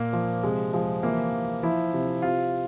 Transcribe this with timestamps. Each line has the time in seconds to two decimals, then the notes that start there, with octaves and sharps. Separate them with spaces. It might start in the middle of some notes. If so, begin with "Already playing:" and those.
Already playing: A#2 A#3
0.13 F3
0.43 C3 G#3
0.73 F3 G#3
1.03 E3 A#3
1.32 E3
1.63 F3 E4
1.93 C3
2.22 C3 F4